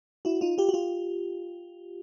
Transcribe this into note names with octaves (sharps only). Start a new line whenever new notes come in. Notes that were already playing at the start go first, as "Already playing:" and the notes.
E4 F#4
D#4 F4
F4 G4
F#4
F4 G4